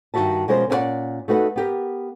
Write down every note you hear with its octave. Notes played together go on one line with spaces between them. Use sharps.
G2 D#3 E4 F#4 E5 A5
B2 F3 G#3 C#4 A#4 C5
A#2 C#4 F#4 B4 D5 F#5
A3 D#4 F#4 B4 F#5
B3 G4 A#4